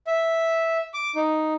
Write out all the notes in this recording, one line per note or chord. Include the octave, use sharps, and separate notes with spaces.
E5
D6
D#4